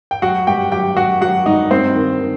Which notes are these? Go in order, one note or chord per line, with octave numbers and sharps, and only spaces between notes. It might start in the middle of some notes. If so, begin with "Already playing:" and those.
G5
F#3 F#4 F#5
G2 G4 G5
F#3 G4 G5
F#3 F#4 F#5
F#3 F#4 F#5
G2 D#4 D#5
G2 C4 C5
D#3
D#3